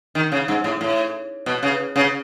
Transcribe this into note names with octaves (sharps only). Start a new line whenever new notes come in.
D#3
C#3
G#2
A2
A2
B2
C#3
C#3